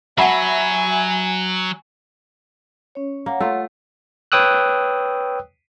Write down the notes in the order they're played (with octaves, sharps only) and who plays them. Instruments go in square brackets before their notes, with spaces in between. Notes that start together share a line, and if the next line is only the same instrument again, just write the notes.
[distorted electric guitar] F#3 [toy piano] F#4 F#5 A5 [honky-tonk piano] E5 B5 C7 [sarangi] G#5
[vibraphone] C#4 C#5
[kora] A#3 [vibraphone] C#5 F#5
[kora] A3 F4
[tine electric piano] B4 C#5 G5 D#6 E6 F#6